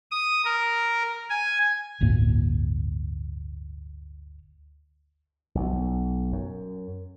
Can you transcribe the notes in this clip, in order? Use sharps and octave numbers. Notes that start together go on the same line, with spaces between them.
D#6
A#4
G#5
G1 D2 A2 A#3
B1
F#2